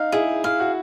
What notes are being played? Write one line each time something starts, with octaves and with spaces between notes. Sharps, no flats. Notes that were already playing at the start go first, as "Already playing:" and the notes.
Already playing: D#4 F5
E4 G#4
E4 F5
F#4